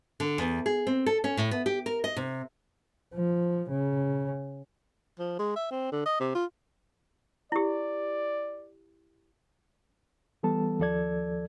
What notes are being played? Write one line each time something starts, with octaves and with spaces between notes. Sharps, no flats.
D3
E2
G#4
C4
A4
C#4
A2
B3
G4
A#4
D#5
C3
F3
C#3
F3
G#3
E5
C4
D3
D#5
C3
F4
E4 G4 D5
E3 G3 B3 A4 A5
D#2 F3 A4 D5 G#6